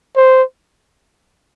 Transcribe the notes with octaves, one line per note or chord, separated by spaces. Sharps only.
C5